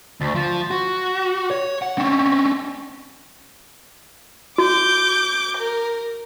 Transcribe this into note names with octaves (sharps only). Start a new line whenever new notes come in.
D2
F3
F#4
C#5
F#5
C4 C#4
F#4 D6 G6
A#4